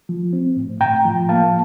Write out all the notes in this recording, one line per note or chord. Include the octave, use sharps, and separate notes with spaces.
F3
C4
A2
A2 G5 A#5
F3
A#3 F5 A5